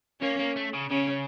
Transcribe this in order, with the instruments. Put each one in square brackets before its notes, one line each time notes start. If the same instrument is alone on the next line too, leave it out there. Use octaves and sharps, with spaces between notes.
[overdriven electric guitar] A#3 [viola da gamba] C#4
[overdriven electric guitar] A#3
A3
C#3
[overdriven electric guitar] C#3 [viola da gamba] C#4